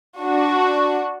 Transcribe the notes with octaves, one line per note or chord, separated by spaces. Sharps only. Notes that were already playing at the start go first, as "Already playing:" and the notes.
D4 F#4